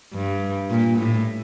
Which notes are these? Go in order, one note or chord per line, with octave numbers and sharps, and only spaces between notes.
G2
A#2
A2